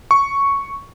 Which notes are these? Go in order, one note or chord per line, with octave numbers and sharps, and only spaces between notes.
C#6